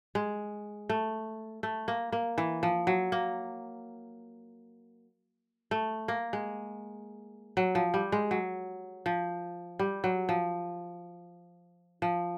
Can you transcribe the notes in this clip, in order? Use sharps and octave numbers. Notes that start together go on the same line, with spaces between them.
G#3
A3
A3
A#3
A#3
E3
F3
F#3
A#3
A3
A#3
G#3
F#3
F3
G3
G#3
F#3
F3
G3
F#3
F3
F3